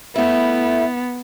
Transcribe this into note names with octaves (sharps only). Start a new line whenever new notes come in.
A3 B3 E4